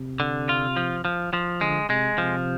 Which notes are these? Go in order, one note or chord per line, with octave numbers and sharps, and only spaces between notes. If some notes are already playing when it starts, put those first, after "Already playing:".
Already playing: C3
D3
F4
F3
F3
F3
D3 G#3
C3 G#3
C3 F3